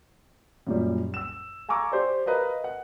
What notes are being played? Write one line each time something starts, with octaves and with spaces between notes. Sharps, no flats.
F#2 A#2 G3
E6 E7
F5 G#5 A#5 C#6 D6 E6
G4 C5 D5
A#4 B4 D#5 F5 A#5
F#5